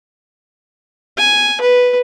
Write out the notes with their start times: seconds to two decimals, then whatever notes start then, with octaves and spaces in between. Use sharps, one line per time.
1.18 G#5
1.61 B4